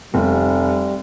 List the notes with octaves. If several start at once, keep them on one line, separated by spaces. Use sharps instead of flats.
F1 G3